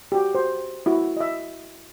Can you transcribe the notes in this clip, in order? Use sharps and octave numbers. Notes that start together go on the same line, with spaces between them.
F#4 G4
F#4 C5
E4 F#4
D#5 E5